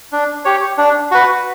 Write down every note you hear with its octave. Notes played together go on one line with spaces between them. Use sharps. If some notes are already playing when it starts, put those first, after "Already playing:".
D4
G4 C#5
D4
F#4 B4